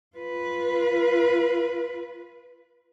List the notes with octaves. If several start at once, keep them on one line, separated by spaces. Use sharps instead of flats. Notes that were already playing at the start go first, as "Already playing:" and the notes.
F4 B4